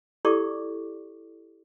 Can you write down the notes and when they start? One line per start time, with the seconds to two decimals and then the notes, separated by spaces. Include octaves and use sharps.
0.25 E4 G4 A4 D5 C#6 D6